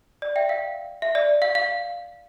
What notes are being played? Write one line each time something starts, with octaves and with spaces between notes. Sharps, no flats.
D5
E5 G5
F5
E5
D5
F5
F5